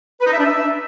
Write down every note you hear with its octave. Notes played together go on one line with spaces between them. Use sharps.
B4
D#4
E5
D4
E5